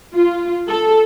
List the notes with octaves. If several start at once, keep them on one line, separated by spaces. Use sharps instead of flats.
F4
A4